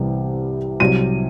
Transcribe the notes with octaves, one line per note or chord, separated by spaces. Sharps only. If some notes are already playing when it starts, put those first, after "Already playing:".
Already playing: C2 C3 E3 G3
C2 C3 F#3 D#7